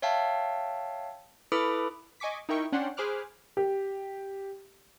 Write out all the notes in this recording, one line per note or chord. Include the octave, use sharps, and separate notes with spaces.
C#5 E5 F5 G5 A5
E4 A4 B4 B5 D6 D#6
D#5 G#5 C#6 D6 B6
D#4 E4 A#4 G5 C#6
C#4 D4 F#5 G5 C6
G#4 C5 B5 D6 F6 F#6
G4